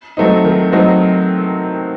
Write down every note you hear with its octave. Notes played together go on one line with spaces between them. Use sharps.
F#3 A3 C4 D#4
D#3
F#3 A3 C4 D#4